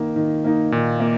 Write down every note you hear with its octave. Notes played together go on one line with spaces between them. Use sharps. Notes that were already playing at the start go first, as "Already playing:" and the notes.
Already playing: D#3 A#3 D#4
D#3
A#3 D#4
A#2 D#3
A#3